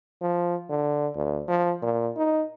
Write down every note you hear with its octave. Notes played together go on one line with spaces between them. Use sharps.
F3
D3
D2
F3
A#2
D#4